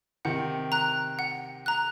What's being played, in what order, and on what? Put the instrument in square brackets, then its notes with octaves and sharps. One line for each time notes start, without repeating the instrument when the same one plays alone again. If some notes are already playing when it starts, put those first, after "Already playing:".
[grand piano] C3 D#3 [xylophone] F#5
[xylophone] A#5 F#6
F#5
A#5 F#6